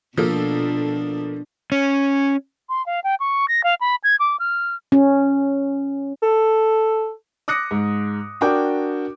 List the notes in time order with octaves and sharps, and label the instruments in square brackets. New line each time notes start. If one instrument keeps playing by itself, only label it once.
[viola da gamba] B2 D4 [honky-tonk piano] F3 A#3 A4
[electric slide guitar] C#4
[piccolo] C6
F5
G5
C#6
A#6
F5
B5
G#6
D6
F6
[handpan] C#4
[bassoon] A4
[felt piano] D6 D#6 F#6 A#6 C#7
G#2
D4 F#4 A#4 G5 D6